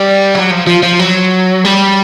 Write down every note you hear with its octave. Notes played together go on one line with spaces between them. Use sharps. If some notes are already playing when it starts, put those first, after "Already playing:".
Already playing: G3
F#3
F3
F3
F3
F#3
G3